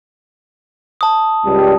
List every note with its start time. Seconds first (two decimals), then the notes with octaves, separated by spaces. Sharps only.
1.01 A5 D#6
1.45 C#2 G3